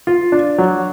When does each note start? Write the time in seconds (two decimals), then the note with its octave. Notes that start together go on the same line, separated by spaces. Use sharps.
0.07 F4
0.32 D4
0.58 F#3